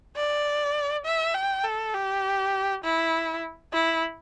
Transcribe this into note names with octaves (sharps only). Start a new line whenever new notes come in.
D5
E5
G5
A4
G4
E4
E4